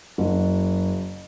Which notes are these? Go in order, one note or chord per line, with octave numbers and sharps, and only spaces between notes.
F#1